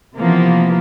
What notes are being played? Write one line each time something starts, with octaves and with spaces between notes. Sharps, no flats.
C3 E3 F3 A#3 B3